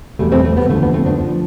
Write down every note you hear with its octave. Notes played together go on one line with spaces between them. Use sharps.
E2 B2 G3 A3
A3 C4
A3
B3
D2 D3 F3 A3
B3
A3 C4
B3 D4
D3 F3